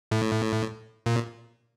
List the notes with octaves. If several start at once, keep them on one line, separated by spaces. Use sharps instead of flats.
A2
A#2